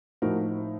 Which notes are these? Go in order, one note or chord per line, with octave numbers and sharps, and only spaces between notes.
A2 F3 C4 D#4 F#4 A#4